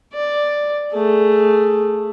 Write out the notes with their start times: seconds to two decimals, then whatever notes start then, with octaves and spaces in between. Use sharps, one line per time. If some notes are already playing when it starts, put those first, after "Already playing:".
0.13 D5
0.92 A3 G#4